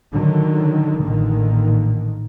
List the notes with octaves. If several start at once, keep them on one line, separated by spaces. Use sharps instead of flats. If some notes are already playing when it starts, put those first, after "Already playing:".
D3 D#3 F#3
A1 A#2 D3 D#3